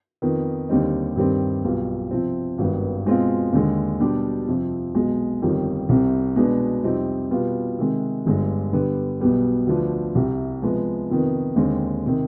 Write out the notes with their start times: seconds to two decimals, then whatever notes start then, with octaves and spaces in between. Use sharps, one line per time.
0.22 F2 D#3 B3
0.69 D#2 D3 G3 C4 D#4
1.16 G2 D#3 G3 C4
1.64 B1 B2 G3 B3 F4
2.11 C3 F3 C4
2.58 G#1 G2 D#3 B3
3.06 B2 G#3 C4 F4
3.53 D#2 D3 G#3
4.00 B2 G3 D4 G4
4.47 F2 C3 F3 C4
4.94 B1 B2 G#3
5.42 G1 F2 D#3 G3
5.89 C2 C3 G3 C4
6.36 B2 G#3 B3 D4
6.84 F2 C3 G3 C4 D#4
7.31 B2 G3 B3 F4
7.79 C3 D#3 G#3
8.26 G1 G2 D3 G#3
8.73 D3 G3 B3
9.20 B1 B2 G3 B3
9.67 D2 D3 F3 B3 D4
10.15 C2 C3 G3
10.62 C3 F3 G#3 B3
11.10 F2 C3 D#3 B3
11.56 D#2 D3 G#3 C4
12.06 C3 D#3